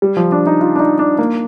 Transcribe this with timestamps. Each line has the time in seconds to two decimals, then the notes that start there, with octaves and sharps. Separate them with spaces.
0.02 G3
0.17 F3
0.32 D4
0.47 D#4
0.61 F4
0.75 D4
0.80 D#4
0.99 D4
1.19 A#3